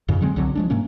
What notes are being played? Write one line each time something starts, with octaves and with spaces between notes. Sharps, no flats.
F2 G#2 C#3
D3 F#3 G#3 C4
C2 D3 F#3 C4
F3 G#3 D4
G#2 C3 A#3 C#4